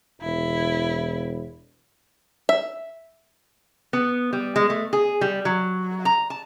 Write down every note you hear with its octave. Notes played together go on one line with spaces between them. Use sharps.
E1 E4
E5
B3
G3
G#3
A3
G#4
G3
F#3
A#5
A5